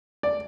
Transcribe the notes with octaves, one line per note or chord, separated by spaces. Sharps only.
D5